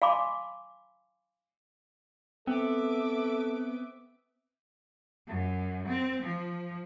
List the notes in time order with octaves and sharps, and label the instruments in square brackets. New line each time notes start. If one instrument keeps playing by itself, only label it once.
[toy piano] F5 G#5 A5 B5 C6 D6
[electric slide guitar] B3 [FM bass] C4 [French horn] A4 [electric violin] E5 D6
[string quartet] F#2
C4
F3